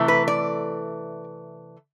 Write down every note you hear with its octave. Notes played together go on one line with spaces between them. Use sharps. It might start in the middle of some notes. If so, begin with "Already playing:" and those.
Already playing: C3 E3 A3
B4
D5